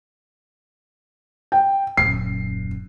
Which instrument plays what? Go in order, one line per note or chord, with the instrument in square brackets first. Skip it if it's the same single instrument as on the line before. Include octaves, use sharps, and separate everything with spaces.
[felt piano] G5
[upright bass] D#1 F#2 [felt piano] C7